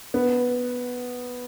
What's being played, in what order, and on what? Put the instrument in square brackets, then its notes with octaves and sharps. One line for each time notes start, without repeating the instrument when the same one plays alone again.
[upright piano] B3